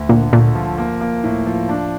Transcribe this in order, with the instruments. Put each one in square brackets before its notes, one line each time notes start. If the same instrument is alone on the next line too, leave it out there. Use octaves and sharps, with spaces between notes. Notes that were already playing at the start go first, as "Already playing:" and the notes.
Already playing: [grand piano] D2
[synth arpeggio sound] A#2 [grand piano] D3
[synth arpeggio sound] A#2 [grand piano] A3
[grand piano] F3
A#3
A#3
A2
F3
D4